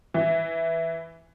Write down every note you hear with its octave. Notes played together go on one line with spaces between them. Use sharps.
E3